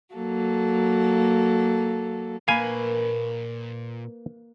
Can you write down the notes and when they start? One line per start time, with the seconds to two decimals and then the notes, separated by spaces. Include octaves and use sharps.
0.14 F#3 A#3 A4
2.48 A#2 A#3 B4 F5 G#5 B5